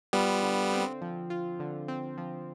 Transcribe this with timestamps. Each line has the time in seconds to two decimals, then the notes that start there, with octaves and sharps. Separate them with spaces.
0.13 G3 B3 F4
0.42 D3
0.73 C4
1.02 F3
1.30 F4
1.60 D3
1.88 C4
2.18 F3